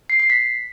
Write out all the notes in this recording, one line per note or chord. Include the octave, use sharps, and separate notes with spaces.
C7
C7
B6